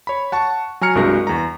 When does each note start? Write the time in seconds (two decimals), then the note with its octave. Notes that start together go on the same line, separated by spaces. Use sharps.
0.07 C#5 B5
0.32 F#5 A5 C#6
0.81 F#3 G#5 A#5 F6 C#7
0.95 C2 G2 G#3 F#4 A#4 A#6
1.27 E2 A#5